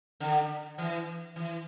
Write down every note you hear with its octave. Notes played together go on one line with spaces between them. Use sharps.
D3
E3
E3